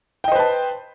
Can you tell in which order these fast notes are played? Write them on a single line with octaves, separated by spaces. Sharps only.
G5 D#5 C5 B4 A5